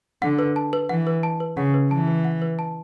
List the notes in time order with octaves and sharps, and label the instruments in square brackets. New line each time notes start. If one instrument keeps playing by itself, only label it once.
[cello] D3 [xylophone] F#5
[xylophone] B4
A5
B4
[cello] E3 [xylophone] F#5
[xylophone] B4
A5
B4
[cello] C#3 [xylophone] F#5
[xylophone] B4
[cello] E3 [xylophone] A5
[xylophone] B4
F#5
B4
A5